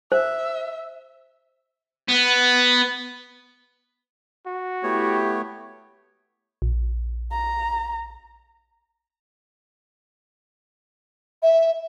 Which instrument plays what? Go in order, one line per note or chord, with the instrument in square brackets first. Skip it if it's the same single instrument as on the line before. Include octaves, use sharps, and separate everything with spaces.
[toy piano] C5 [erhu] E5
[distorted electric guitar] B3
[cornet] F#4
[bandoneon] A3 B3 C#5 [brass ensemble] E4 G4
[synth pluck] A#1
[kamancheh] A#5
[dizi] E5